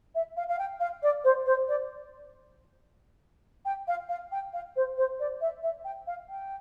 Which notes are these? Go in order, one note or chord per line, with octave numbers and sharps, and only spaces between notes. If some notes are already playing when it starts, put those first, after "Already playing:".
E5
F5
F5
G5
F5
D5
C5
C5
D5
G5
F5
F5
G5
F5
C5
C5
D5
E5
E5
G5
F5
G5